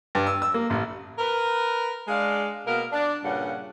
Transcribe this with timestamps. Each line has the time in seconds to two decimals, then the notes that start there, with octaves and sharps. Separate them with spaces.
0.15 G2
0.27 E6
0.42 E6
0.54 A#3
0.70 A1
1.19 A#4 B4
2.08 G#3 D4 F5
2.66 B2 A#3 A#4
2.92 D4
3.23 G2 A#2 C#3 F#5